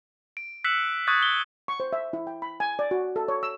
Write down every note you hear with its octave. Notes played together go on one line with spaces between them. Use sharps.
D7
E6 F#6 B6 C#7 E7 F#7
C#6 D#6 F#6 G#6 A6
G7
C#6
C5
E5
E4
G5
B5
G#5
D5
F#4
A4
C#5
E6